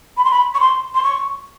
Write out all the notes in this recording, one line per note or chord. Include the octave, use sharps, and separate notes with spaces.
B5
C6
B5
C#6
C6
C6
C#6